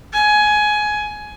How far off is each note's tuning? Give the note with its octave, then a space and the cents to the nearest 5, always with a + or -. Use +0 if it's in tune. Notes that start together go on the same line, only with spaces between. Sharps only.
G#5 +15